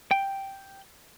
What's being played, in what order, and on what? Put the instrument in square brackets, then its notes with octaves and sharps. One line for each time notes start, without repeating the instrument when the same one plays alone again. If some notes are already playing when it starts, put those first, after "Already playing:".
[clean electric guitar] G5